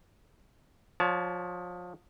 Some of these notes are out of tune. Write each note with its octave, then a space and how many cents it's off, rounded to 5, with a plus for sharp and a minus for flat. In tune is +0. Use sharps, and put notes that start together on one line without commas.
F3 +30 C#5 +35 A5 -25